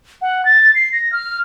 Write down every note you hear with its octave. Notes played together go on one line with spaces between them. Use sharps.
F#5
A6
C7
A#6
F6